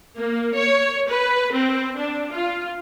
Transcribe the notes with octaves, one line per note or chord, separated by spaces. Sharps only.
A#3
C#5
B4
C4
D4
F4